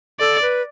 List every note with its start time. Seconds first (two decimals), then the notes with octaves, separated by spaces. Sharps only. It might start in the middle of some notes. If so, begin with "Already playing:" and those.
0.20 A4 D5
0.42 B4